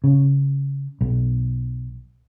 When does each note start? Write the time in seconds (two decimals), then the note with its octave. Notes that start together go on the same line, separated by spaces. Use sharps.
0.04 C#3
1.01 B1